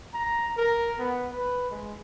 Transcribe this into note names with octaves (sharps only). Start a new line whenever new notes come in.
A#5
A#4
B3
B4
G#3